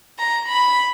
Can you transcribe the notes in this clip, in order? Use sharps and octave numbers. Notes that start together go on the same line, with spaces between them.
A#5
B5